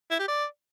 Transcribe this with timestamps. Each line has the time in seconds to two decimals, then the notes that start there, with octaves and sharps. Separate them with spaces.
0.10 E4
0.19 G4
0.28 D5